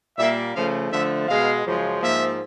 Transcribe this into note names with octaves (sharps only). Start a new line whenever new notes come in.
A#2 G3 A#3 E5
C#3 F3 A3 F5
D3 F3 A3 E5
B2 G#3 B3 F5
F#2 C#3 F3 G#3
G#2 F3 A#3 E5